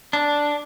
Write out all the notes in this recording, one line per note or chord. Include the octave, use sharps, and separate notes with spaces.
D4